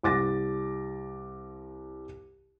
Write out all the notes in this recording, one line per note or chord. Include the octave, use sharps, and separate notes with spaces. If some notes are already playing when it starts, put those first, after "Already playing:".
C2 D6 A6 A#6